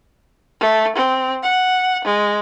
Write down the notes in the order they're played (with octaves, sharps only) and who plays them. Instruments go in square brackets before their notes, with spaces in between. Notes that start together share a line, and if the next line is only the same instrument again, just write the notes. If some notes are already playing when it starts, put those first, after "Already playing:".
[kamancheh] A3
C4
F#5
G#3